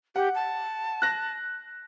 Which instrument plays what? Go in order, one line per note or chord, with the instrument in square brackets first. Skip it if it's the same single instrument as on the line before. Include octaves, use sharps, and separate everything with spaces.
[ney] G4 [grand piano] F#5
[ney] A5
[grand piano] F#6 A#6